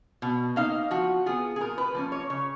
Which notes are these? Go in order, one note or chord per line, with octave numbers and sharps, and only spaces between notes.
B2
A#3 D#4 F5
F3 F#4
B3 F4 G#4
G#4
A#2 A#4
B4
F3 A#3 C#4
C#5
C#3 C#5